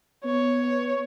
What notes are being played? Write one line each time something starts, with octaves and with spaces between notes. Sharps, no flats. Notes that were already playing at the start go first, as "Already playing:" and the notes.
B3 C#5